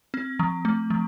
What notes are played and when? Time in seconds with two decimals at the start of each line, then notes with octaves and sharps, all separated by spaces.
0.14 C4
0.39 F3
0.65 A3
0.90 F3